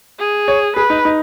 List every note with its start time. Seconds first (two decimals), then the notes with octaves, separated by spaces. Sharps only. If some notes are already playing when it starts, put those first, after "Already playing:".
0.19 G#4
0.48 C#5
0.76 G#4 B4
0.90 D#4
1.05 D#4